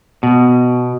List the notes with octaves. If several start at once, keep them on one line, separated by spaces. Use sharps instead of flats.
B2